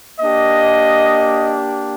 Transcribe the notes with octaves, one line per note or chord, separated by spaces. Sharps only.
A#3 D4 G4 D#5